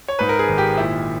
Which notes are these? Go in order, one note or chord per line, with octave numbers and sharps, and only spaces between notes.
C#5
G#2 B4
A#4
G#4
G#1
G4
A#2 E4